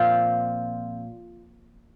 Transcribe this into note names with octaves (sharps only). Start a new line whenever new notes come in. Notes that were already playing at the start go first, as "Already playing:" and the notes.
Already playing: A#2 F3 C4 F4